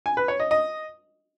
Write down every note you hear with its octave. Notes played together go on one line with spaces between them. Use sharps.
G#5
B4
C#5
D#5
D#5